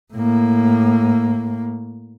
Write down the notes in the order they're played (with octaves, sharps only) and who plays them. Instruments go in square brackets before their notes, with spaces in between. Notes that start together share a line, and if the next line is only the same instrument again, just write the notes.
[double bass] A2 A#3